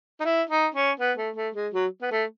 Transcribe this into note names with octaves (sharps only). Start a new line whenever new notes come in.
D#4
E4
D#4
C#4
B3
A3
A3
G#3
F#3
B3
A3